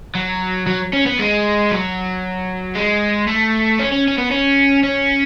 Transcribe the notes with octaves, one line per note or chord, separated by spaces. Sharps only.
F#3
F#3
C#4
B3
G#3
F#3
G#3
A3
C#4
C#4
C#4
B3
C#4
C#4